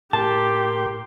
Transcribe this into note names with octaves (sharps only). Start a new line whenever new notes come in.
A2 G4 A#4 A5 C6